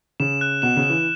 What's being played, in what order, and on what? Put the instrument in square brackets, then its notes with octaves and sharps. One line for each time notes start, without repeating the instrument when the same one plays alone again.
[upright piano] C#3 [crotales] E7
[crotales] F#6
[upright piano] B2 [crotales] E7
[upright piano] C#3
[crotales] E7
[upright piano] E3